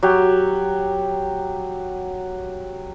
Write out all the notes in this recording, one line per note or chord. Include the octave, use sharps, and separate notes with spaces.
F#3 G4